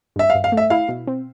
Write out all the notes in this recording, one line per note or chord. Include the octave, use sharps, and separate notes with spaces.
G2 E5
F5
G2
F5
A3
E5
E4 F5
B2
C4